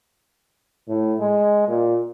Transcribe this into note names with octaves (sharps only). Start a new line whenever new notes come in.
A2
G#3
A#2